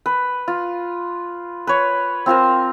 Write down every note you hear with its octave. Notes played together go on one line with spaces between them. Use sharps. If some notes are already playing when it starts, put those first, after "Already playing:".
B4
F4
B4 C#5
C4 F4 A#4 C5